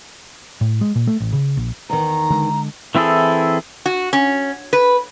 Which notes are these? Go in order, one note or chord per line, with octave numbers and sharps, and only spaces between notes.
A2
G#3
A#2
A3
A1
C#3
A#1
E2 D#3 A#5
D3 G#3
E3 C4 E4 G#4 A4
F#4
C#4
B4